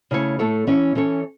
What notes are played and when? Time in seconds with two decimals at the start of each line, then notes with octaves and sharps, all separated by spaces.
0.11 C#3 A3 E4 C#5
0.39 A2 A3 E4 A4 C#5
0.67 E3 C#4 E4 C#5
0.95 E3 C#4 A4 C#5